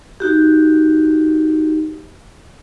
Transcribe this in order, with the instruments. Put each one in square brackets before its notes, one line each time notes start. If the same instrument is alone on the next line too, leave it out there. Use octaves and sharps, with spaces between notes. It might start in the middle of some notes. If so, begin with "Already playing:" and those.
[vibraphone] D#4 F#4 G4